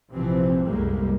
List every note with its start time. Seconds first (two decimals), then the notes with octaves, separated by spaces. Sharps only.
0.11 A#1 C3 E3 F3 C4
0.66 C2 F#2 A2 G3 G#3 A#3